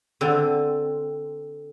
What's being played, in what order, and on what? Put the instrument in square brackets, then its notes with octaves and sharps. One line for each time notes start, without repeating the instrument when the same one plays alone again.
[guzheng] D3 C4